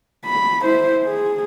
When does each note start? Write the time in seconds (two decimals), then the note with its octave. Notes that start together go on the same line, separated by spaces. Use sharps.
0.25 B5
0.63 E4 C5
1.04 G#4